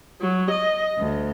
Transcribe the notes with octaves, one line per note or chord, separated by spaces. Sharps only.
F#3
D#5
D2